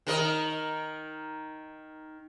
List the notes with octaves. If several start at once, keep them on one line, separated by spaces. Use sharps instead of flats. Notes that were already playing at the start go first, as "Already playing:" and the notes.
D#3 A#4 D#5